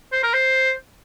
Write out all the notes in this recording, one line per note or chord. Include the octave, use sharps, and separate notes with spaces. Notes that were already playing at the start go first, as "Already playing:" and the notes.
C5
A#4
C5